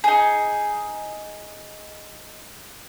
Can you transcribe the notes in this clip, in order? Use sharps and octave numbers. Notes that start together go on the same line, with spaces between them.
D#4 G#4